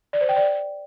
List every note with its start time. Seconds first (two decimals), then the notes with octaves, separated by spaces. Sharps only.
0.13 D5
0.21 C5
0.29 G5
0.37 D5